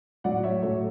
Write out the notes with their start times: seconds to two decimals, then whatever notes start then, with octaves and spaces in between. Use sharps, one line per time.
0.24 A2 F#3 D5 F#5
0.43 C#5 E5
0.63 A2 F#3 A4 C#5